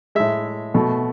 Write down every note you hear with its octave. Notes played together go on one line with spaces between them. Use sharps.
A2 G#3 E5
B2 A3